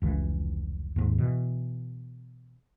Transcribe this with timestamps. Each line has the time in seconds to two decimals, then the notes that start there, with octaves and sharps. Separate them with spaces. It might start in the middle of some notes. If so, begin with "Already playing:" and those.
0.02 F1 C#2 E3
0.96 D#2 G#2
1.18 B2 E3